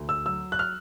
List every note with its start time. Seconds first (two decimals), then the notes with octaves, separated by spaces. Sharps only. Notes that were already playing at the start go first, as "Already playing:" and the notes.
Already playing: D2
0.09 E6
0.26 F#3 E6
0.52 F#6
0.59 F6